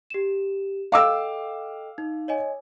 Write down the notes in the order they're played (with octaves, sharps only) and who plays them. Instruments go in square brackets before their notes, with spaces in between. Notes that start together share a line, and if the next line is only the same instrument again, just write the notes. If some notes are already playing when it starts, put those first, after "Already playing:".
[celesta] G4 E7
[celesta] A4 D#5 G5 [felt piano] F5 D6 E6
[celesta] D#4
C#5 D#5 G#5